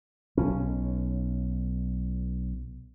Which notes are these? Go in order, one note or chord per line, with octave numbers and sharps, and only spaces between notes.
B1 C#4